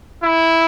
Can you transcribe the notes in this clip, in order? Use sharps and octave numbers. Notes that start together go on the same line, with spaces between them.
E4